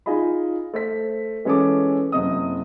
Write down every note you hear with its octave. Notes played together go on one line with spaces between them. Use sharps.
D#4 F4 G#4 D#5 B5
A3 C5 B6
E3 G#3 C#4 G#4 A4 D6
F#1 C3 D#5 D#6